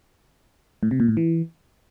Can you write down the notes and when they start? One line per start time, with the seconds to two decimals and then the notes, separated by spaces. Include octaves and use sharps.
0.83 A2
0.91 C3
1.00 A#2
1.08 A2
1.17 E3